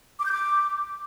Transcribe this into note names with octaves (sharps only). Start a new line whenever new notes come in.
D6
G6
D6